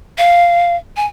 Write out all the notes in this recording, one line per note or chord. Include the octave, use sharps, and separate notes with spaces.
F5
G#5